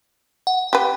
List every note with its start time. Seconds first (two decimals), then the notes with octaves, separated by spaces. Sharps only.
0.47 F#5
0.73 G4 B4